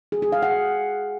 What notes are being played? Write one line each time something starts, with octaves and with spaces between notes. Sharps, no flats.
G#4
G#4
F5
F#5